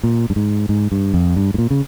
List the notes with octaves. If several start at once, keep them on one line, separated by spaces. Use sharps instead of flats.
A#2
G2
G#2
G#2
G2
F2
G2
G#2
A#2
C#3